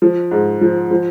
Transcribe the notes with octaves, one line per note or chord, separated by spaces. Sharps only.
F3
G#2
F3
F3